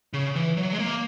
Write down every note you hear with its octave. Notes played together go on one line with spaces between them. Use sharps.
C#3
E3
F#3
G#3
A#3